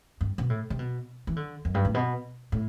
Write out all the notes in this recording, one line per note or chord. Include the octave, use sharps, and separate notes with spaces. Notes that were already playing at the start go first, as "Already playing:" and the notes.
G2
B2
A2
C3
B2
E3
D3
F#2
G2
A2
B2
A2